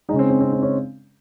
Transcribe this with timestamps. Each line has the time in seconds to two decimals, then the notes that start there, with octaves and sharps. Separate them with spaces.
0.09 G#3 D#4
0.13 C#3 C#4
0.19 C4
0.30 C4
0.41 C4
0.53 C4
0.62 C#4